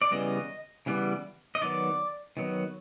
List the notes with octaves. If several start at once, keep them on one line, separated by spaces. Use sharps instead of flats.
D5
C#3 E3 G3 B3 D#5
C#3 E3 G3 B3
D#5
D#3 F#3 B3 D5
D#3 F#3 B3